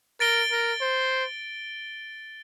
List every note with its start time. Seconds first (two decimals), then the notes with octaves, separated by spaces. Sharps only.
0.20 A#4 A6 D7 G7
0.51 A#4
0.81 C5